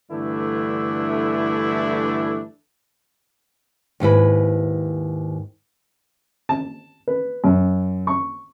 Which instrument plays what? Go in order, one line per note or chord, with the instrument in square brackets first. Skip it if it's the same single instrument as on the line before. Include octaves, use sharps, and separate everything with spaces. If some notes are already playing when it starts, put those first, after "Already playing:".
[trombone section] G2 D3 E3 A3 D4 E4
[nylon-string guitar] D#2 G#2 E4 B4
[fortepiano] A5
B4
F#2
C#6